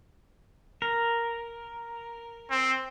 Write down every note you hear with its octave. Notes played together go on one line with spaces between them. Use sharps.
A#4
C4